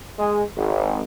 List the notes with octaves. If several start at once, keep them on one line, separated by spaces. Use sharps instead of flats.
G#3
G#1